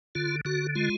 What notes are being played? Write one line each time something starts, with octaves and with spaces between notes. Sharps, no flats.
D3 F4
D3 F#4
G#3 F4